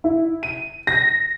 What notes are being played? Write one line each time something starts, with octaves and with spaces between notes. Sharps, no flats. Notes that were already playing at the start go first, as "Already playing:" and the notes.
E4
D#7
A#6